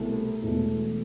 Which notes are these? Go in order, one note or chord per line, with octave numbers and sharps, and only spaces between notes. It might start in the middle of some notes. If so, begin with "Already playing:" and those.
Already playing: C2 B2 A3 C4
E1 E2 B2 A3